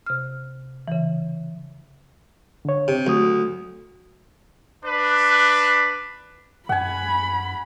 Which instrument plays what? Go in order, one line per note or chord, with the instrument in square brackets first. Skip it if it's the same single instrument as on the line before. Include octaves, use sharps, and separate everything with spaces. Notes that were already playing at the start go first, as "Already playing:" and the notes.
[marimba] C3 F6
C#3 E3
[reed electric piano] D3 C#5
[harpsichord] C3
[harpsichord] D2 [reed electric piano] F#3 A3 D#6
[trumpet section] D4 B4
[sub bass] F#2 [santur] F#5 G#5 [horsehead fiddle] B5